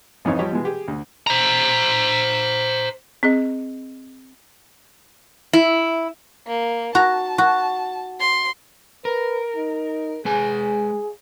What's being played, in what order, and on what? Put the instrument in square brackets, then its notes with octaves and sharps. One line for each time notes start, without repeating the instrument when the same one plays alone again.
[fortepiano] G#1 F2 E3 D#4 C#5
F3 G3 G4 C#5 D#5
B2 E3 G#3
G4 G#4
D2
[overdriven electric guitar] C5 A#5
[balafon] C4 G#4 D#5
[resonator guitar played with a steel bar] E4
[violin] A#3
[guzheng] F#4 A#5 [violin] A5
[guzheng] F#4
[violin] C6
[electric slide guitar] A#4 [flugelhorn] B4
[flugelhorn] D#4
[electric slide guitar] G#3 B4 G#5 [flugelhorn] G#4